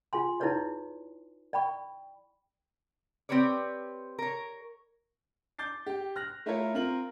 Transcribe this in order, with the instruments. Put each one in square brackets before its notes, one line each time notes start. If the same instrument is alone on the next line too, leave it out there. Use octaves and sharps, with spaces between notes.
[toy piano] F4 G#4 G#5 C6
D#4 E4 G#4 B4 C#5 D5
D5 G5 B5 C#6
[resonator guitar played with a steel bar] C4 G4 B4 C#5 D5
A#4 C#5
[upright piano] D6 G6 A6 C7
G4 G5
F6 F#6 A#6
A3 E4 F4 A4 A#4 C#5
C4 F4 A#4 F#7